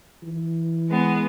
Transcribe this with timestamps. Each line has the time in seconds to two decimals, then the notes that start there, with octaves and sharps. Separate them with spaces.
0.23 E3
0.88 G#3 B3